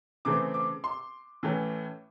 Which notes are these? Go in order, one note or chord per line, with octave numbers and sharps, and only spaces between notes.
C#3 E3 A3 C4 D6
D6
C6
A2 E3 A3 C#4